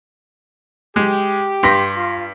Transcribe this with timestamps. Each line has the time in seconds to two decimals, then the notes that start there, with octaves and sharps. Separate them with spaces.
0.96 G#3 G4
1.63 G2 C6 A#6 B6
1.97 F4